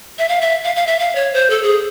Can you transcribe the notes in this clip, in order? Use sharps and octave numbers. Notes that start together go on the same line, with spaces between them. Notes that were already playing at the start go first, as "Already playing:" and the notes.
E5
F5
E5
F5
F5
E5
F5
C#5
C5
A4
G#4